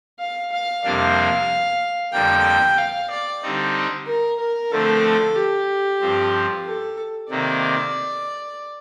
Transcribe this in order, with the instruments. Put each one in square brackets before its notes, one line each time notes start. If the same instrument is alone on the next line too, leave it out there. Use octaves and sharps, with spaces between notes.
[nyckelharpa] F5
F5
[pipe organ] F2 C3 G3 A#3 D4 [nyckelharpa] F5
[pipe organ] F2 D3 G3 A#3 [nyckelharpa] G5
[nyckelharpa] F5
D5
[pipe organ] D3 G3 C4 D#4
[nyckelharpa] A#4
A#4
[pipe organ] D3 F3 A3 C4 [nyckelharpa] A4
[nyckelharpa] G4
[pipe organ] G2 F3 C4
[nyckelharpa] A4
[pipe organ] C3 D#3 A#3 [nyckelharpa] D5